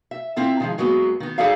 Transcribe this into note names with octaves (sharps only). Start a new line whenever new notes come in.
E5
C4 E4 F4 A4
D#3 F3 G#3
F#2 F#3 G#3 A#3 B3
D#3 B3
D#4 G#4 A4 D5 E5 F5